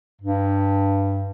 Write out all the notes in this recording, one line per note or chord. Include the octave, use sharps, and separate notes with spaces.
G2